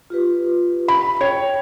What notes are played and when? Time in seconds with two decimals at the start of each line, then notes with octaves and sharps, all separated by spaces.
0.10 F4 G4 B4
0.88 B5
1.21 C#5 G5